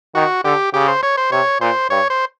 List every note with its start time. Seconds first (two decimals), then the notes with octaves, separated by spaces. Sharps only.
0.15 D#3 F#4
0.45 D3 G4
0.74 C#3 G4
0.88 C5
1.03 C#5
1.17 C5
1.32 C3 C#5
1.61 A#2 C5
1.90 G2 C#5
2.10 C5